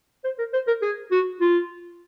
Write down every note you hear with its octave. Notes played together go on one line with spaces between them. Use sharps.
C5
A#4
C5
A#4
G#4
F#4
F4